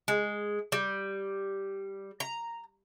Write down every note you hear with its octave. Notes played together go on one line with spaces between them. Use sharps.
G#3
G3
A#5